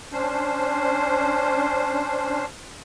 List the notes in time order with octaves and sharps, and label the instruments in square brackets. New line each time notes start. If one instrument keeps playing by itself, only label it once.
[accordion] C#4 D4 C5